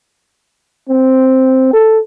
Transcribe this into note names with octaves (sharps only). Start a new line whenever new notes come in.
C4
A4